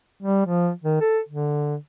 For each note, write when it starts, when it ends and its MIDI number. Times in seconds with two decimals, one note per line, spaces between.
0.23 0.45 55
0.46 0.71 53
0.84 0.97 51
1.01 1.20 69
1.29 1.76 50